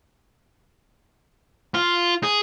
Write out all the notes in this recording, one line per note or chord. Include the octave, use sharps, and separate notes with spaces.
F4
G#4